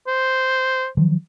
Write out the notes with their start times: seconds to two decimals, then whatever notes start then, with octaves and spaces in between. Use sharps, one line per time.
0.07 C5
0.97 D#3 F3 F#3